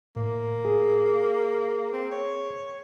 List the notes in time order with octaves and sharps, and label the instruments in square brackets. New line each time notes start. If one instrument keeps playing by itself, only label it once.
[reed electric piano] A2 [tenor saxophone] A#3
[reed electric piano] G#4
[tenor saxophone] C4
C#5